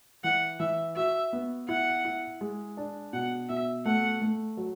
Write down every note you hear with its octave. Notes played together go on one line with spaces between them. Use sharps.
E3 F#5
E3 E5
F#4 E5
B3
E4 F#5
E4
G#3
D4
B2 F#5
B2 E5
A3 F#5
A3
F#3